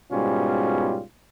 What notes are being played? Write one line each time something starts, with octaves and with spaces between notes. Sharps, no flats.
G#2 B2 G3 C#4 F4